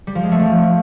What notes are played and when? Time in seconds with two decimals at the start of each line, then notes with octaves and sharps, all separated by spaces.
0.07 G3
0.15 F3
0.23 G#3
0.32 A3
0.40 F3